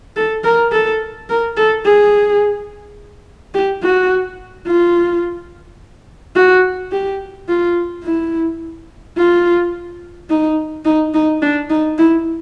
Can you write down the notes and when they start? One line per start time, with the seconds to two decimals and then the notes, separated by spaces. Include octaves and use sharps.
0.16 A4
0.44 A#4
0.72 A4
1.29 A#4
1.57 A4
1.85 G#4
3.54 G4
3.83 F#4
4.67 F4
6.36 F#4
6.92 G4
7.48 F4
8.04 E4
9.17 F4
10.30 D#4
10.85 D#4
11.14 D#4
11.42 D4
11.70 D#4
11.98 E4